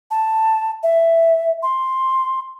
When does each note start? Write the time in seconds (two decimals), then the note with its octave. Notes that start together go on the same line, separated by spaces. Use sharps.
0.11 A5
0.83 E5
1.63 C6